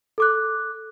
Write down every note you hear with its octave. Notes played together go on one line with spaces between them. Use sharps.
A4 D6 F#6